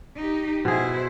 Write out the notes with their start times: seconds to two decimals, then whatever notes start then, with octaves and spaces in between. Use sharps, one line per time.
0.16 D#4 G4
0.65 B2 E4 G#4 C5